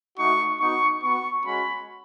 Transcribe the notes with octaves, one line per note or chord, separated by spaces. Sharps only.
A3 D#4 F#4 C#6
B3 D#4 F#4 C#6
B3 F#4 C#6
G#3 C#4 F#4 B5